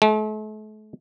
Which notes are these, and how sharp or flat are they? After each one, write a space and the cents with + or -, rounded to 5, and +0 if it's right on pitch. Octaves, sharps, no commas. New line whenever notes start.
A3 -40